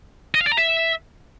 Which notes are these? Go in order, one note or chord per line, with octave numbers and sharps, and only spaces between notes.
D#5
F5
D5
A#5
E5